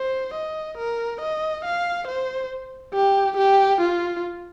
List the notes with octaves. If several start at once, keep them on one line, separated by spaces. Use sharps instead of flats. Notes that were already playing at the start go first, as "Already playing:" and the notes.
Already playing: C5
D#5
A#4
D#5
F5
C5
G4
G4
F4